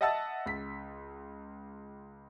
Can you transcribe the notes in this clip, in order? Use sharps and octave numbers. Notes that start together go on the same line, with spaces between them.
D#5 E5 F#5 A5 E6 A6
C#2 B6